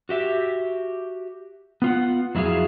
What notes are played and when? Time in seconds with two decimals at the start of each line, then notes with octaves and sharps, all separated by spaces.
0.09 F#4 G4 E5
1.82 B3 F4 F#5
2.35 F2 F#3 E4 F4 G#4 F5